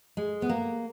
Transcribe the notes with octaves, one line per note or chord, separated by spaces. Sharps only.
G#3
B3
A#3